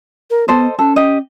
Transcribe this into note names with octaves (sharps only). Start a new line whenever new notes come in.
A#4
B3 A4 C5 D#5
C#4 A4
G4 D#5